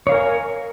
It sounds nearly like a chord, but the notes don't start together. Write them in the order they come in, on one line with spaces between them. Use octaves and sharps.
C#5 F5 A#4 G#5